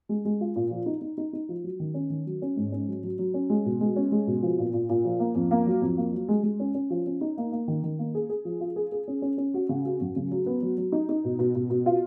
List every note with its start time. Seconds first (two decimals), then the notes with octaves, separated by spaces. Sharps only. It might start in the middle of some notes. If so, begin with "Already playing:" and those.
0.09 G#3
0.25 G#3
0.41 F4
0.56 A#2
0.71 F3
0.86 D#4
1.01 D#4
1.17 D#4
1.33 D#4
1.49 F3
1.64 F#3
1.80 D#3
1.94 C#4
2.10 D#3
2.26 F#3
2.42 C#4
2.56 G#2
2.72 C#4
2.88 F#3
3.03 F#3
3.19 F#3
3.34 C#4
3.50 G#3
3.65 B2
3.81 G#3
3.96 C#4
4.12 G#3
4.27 B2
4.42 F3
4.58 A#2
4.73 A#2
4.89 A#2
5.05 F3
5.19 A#3
5.35 F2
5.51 A#3
5.67 F#3
5.81 F2
5.97 A#3
6.13 F#3
6.29 G#3
6.43 G#3
6.60 C#4
6.74 C#4
6.90 F3
7.06 C#4
7.21 D#4
7.37 A#3
7.52 A#3
7.68 D#3
7.83 D#3
7.99 A#3
8.15 G#4
8.29 G#4
8.45 F3
8.60 F4
8.76 G#4
8.92 G#4
9.08 C#4
9.22 C#4
9.38 C#4
9.54 F#4
9.69 C#3
9.85 F#4
10.00 F#2
10.16 C#3
10.31 F#3
10.46 B3
10.62 F#3
10.78 F#3
10.92 D#4
11.09 D#4
11.24 B2
11.39 B2
11.55 B2
11.70 B2
11.86 F4